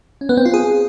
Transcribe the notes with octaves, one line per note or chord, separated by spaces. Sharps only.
C#4
B3
C4
F4
G#4